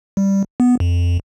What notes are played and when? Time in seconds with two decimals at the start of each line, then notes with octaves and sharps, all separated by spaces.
0.17 G3
0.60 B3
0.80 F2